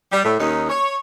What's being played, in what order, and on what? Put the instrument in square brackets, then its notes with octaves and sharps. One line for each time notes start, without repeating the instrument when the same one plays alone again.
[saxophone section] G3
A2
D#2 C#4 D#4
C#5